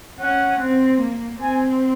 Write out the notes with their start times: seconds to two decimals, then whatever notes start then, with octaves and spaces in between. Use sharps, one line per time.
0.20 C#4 F#5
0.61 C4
1.01 A#3
1.42 C4 G#5